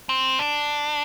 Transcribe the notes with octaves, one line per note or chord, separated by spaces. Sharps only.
C4
D4